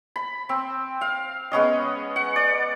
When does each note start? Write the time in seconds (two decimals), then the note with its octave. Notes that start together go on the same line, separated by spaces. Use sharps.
0.16 B5
0.49 C4
1.01 F5
1.52 G#3 B3 C#4 D#5
2.16 F#5
2.36 D5